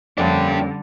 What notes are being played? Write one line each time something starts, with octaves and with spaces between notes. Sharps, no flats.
F2 D3 G3 A#3 C#4 D4 G4